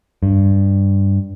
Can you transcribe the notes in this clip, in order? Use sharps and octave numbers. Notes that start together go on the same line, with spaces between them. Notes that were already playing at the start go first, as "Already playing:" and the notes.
G2